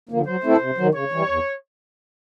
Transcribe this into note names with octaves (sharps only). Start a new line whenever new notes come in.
D3 F3 A#3
F#3 C5
A3 C4 E4 A4
C3
D#3 F#3
C#3 C#5
E3 G3
E2